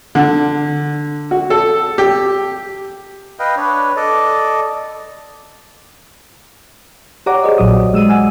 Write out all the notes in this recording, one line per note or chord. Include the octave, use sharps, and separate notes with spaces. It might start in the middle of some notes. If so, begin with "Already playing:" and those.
D3
F#4
A4
G4
B4 D#5 F5 G5
D4 B4 C#5
A4 D5 D#5
G4 C#5 D5 F#5 A#5 D6
G#4 C5 D#5
A#1 A#2 F#3 F#4 D#6
G#3 E6 D#7
F#5 G#5 E6